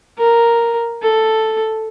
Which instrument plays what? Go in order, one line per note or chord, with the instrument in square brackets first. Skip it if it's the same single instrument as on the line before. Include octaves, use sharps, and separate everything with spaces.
[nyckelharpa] A#4
A4